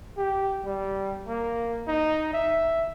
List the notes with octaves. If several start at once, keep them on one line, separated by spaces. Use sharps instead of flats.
G4
G3
A#3
D#4
E5